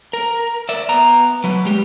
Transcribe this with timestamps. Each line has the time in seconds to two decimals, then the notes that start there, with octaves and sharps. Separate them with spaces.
0.13 A#4
0.69 D5 E5
0.89 B3 A#5
1.44 F#3 B4
1.65 G#3 G4